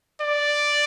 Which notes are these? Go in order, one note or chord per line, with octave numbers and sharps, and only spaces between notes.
D5